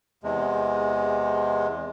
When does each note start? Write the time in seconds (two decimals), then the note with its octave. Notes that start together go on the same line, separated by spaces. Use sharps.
0.23 E2 C3 G#3